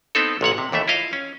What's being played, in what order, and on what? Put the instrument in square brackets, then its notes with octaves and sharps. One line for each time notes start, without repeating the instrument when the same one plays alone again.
[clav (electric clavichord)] B3 C4 D#4 A4
A1 A#2 C#5 F#5
C3
D#2 E3 A3 E5
E4 F4 D#5 F5
C#4